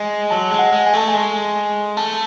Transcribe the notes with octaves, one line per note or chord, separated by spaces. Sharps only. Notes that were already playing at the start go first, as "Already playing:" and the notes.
Already playing: G#3
F#3 A5
G#3
F#5
G#3
G#5
A3 A5
G#5
G#3
A3 A5